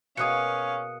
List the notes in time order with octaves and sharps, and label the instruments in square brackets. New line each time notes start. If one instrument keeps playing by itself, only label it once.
[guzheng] B2 A#3 G#4 [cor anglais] C#4 [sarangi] F5 [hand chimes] D#6 F#6 C#7